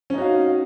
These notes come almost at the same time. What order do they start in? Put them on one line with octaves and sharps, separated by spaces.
C#4 D#4 F#4 F5